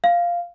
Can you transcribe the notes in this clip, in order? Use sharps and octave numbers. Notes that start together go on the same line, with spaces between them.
F5